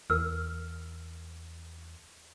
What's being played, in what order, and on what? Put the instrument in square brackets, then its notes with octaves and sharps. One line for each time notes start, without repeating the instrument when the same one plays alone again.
[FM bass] E2 [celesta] A#4 E6 F6